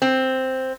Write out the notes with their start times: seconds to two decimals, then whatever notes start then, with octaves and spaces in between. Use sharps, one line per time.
0.02 C4